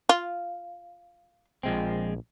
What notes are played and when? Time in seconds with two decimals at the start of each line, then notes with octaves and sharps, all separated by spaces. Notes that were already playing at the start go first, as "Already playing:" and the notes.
0.09 F4
1.63 A#1 F3 G#3 C4